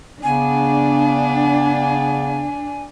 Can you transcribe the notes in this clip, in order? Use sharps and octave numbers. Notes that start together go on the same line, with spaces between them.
C#3 B3 D4 G#5